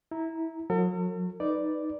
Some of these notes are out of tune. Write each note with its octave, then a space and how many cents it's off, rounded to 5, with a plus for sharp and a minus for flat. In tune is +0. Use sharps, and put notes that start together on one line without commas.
E4 -20 A#5 +0
F#3 -35 A4 +45
D#4 +0 B4 +0 D5 +0